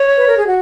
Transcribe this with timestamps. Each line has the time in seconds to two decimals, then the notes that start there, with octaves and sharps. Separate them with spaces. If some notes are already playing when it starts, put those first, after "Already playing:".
Already playing: C#5
0.17 B4
0.27 A#4
0.36 G#4
0.46 F#4